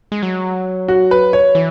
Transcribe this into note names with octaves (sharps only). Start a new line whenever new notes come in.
G#3
F#3
F#4
B4
C#5
E3